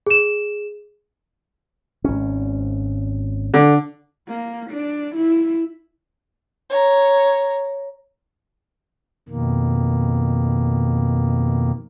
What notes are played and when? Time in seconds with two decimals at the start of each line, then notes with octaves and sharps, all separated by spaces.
0.06 G#4 E7
2.04 G#1 C#4
3.54 D3
4.27 A#3
4.70 D4
5.15 E4
6.70 C#5 A#5
9.29 F2 B2 D#3 A#3